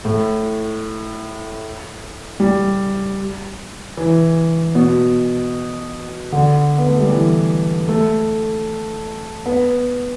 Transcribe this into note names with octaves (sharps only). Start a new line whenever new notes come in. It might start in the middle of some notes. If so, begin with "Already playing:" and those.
A2
G3
E3
B2
D3
B3
A3
G3
E3
A3
B3